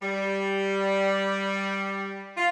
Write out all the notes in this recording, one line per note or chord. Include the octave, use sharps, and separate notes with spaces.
G3
F4